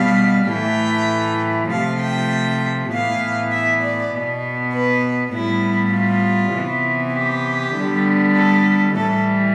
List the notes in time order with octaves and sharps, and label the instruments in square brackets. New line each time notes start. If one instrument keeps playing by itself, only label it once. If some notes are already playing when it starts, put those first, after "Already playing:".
Already playing: [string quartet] B2 G3 B3 F5
A2 E3 A3 G5
C3 F3 A3 F5
G5
A2 E3 B3 F5
E5
D5
B2 B3
B4
A2 G3 B3 E4
F4
C3 E3 B3
G4
D3 G3 B3
A4
A2 E3 G3 A4